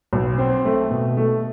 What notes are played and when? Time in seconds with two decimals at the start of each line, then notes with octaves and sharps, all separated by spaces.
0.13 B1
0.38 C4
0.65 A3
0.91 B2
1.17 A3